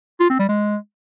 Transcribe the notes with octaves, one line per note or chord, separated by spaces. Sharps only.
F4
C4
G3
G#3